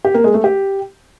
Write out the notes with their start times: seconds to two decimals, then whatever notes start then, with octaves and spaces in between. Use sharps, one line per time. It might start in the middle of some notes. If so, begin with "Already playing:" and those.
0.05 G4
0.14 A#3
0.24 G#3
0.34 A3
0.44 G4